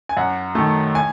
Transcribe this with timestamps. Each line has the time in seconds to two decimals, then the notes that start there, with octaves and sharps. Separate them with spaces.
0.09 G#5
0.17 F#2 F#5
0.55 D#3 A3
0.95 G#5